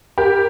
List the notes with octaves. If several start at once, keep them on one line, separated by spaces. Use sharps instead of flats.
G4 A#4